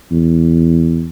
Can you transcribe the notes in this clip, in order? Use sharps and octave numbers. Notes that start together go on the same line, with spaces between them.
E2